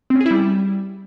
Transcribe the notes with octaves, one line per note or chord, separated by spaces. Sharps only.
C4
C#4
G#4
E4
G3